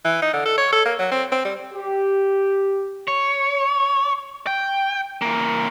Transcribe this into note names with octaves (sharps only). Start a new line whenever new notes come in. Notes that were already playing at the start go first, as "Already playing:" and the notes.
E3
D#4
D3
A4
C#5
A4
A#3
F#3
C4
C4
G3
G4
C#5
G5
E3 A#3